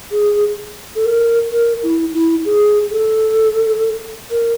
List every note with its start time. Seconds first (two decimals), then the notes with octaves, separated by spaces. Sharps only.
0.11 G#4
0.96 A4
1.05 A#4
1.52 A#4
1.83 E4
2.14 E4
2.45 G#4
2.91 A4
4.31 A#4